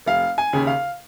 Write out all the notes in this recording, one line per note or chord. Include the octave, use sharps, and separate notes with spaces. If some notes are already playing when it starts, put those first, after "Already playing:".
F1 F5
G#5
D#2 C#3
F5